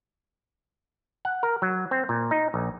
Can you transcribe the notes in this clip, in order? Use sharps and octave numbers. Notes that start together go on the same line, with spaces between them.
F#5
A#4
F#3
C4
A#2
D#4
A#1